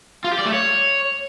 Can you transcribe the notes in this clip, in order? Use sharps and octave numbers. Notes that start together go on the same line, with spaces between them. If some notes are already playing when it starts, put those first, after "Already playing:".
F4
G4
D5
A3
C#5